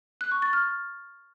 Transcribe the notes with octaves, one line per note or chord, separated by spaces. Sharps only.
F#6
C#6
A6
F6